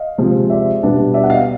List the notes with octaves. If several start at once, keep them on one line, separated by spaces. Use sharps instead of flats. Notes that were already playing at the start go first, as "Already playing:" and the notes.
Already playing: D#5 F5
C3 F3 G#3
D5 E5
B2 G3 B3 D4
D5 E5
F#5
D#5 F5